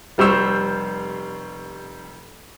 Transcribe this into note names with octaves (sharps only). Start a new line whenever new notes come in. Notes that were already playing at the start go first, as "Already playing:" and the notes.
F1 G3 C5 C#6 E6